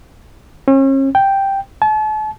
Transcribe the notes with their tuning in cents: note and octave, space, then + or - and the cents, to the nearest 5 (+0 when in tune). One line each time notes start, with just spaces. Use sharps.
C#4 -40
G5 +0
A5 -40